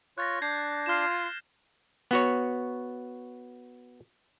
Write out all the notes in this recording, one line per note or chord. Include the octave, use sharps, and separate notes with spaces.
F4 C#5 F#6 A6 A#6
D4 G6 G#6 C7
F4 F6 E7
B3 F#4 C#5